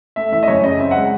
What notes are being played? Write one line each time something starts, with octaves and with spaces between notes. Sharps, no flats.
A3 E5
E3 E5
D#5
F#2 C#5
C#3 D#5
C4 E5
G#3 F#5